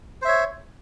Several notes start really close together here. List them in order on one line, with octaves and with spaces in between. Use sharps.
C5 E5 C#5